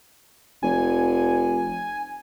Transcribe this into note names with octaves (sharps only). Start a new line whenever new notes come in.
F1 G#5